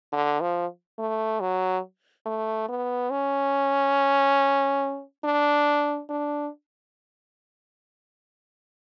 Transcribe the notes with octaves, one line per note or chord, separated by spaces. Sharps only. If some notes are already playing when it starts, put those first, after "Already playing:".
D3
F3
A3
F#3
A3
B3
C#4
D4
D4